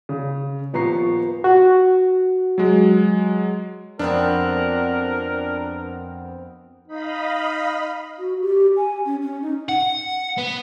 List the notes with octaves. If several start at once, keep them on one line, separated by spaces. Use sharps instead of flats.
C#3
D#1 F3 B3 A#5 C#6 C7
F#4
F#3 G#3
F2 B3 C4 D4 A#4
D#4 D#5 F5 B5
F#4
G4
G#5
C#4
C#4
D#4
F#5
B3